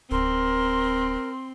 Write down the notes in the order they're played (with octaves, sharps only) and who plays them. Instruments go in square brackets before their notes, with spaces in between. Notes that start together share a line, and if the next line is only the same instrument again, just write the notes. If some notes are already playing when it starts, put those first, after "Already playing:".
[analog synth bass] D1 [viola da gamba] C4 [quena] A#4 [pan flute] C6